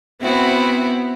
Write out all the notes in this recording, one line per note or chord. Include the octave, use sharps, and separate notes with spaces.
B3 C4 E4 F#4